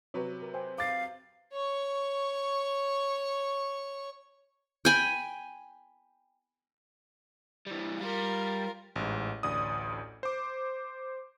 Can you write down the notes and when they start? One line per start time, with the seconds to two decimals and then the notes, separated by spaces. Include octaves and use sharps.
0.14 C3 F#3 B4 C#5
0.42 A#4
0.54 C5 G5 G#5
0.78 F5 D6 A6
1.53 C#5 C#6
4.85 G5 G#5 B5
7.67 E3 G3
8.01 G3 F4 A#4
8.96 A1 G#2
9.43 A1 D2 D5 D#6
10.23 C5 D6